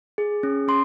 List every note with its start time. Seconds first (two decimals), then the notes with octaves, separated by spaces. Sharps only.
0.18 G#4
0.43 C#4
0.68 C#4 C6